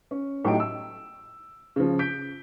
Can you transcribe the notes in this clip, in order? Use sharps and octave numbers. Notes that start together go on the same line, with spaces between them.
C#4
A2 F#3 D#4 G4 D7
E6
C#3 F3
G6 B6 D7